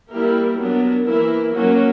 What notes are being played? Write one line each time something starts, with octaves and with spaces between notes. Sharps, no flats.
G3 A#3 E4 G4 A#4
F#3 B3 D4 A#4
E3 A#3 E4 A#4
F#3 A#3 C#4 F#4